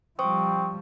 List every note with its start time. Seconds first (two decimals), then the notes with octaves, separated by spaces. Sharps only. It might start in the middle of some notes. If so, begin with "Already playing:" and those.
0.19 F3 G3 C4 C5 C#6 D#6